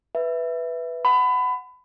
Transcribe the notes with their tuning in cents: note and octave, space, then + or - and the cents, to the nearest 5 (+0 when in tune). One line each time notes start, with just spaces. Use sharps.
B4 +0 E5 +0
F#5 +0 B5 +25